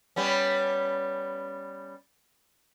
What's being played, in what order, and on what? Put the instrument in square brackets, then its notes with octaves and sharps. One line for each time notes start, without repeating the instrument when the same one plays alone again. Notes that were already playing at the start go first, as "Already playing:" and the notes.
[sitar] G3 B3 C#4